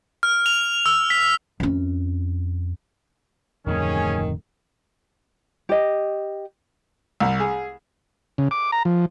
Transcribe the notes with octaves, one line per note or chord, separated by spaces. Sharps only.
F6
F7
E6
B6
F2 C#4
D1 F2 D#3 A3 C#4 G#4
G4 D#5
C2
G#4
C#3
D6
A#5
F3